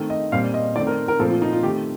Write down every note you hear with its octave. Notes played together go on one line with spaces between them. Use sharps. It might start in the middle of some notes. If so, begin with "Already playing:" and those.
Already playing: D#3 A3 C4
D#5
A#2 G3 C4 F5
D#5
D#3 A3 C4 D5
A#4
A#4
A#2 F3 A3 C4 A4
F4
D#4
F4
D#3 A3 C4 G4